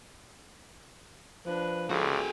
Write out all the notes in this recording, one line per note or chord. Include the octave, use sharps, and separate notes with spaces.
F3 D4 B4
C#2 F#4 G#4 A4